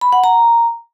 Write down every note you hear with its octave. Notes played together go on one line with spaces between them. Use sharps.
B5
F#5
A#5